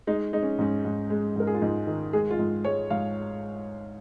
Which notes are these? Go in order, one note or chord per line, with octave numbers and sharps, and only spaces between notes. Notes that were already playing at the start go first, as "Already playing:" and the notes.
G#3 D#4
G#3 D#4
C#4
G#2 C#4
G#2
G#3
G#2 A#4
G#4
F4
G#2 D#4
D#3
G#3 G#4
F4
G#2
G#3 C#5
G#2 F5